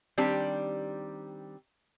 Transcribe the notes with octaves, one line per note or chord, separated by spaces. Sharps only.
D#3 G3 C4 D4 G4